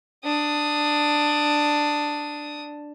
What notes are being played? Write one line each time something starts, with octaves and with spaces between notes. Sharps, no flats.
D4 D#6